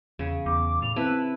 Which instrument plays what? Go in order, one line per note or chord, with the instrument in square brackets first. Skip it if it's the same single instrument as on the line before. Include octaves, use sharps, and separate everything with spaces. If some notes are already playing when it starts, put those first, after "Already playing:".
[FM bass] E2 [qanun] C#3
[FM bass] E2 [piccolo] D6
[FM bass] A2 [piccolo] F7
[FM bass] C4 [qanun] E4 B4 [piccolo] A5